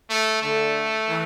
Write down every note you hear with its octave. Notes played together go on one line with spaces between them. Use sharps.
A3
D3 A3
E3